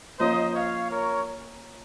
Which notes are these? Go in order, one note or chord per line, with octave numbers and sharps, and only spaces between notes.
F3 A#3 C#4 C5 D#5
C#5 F5
A#4 C#5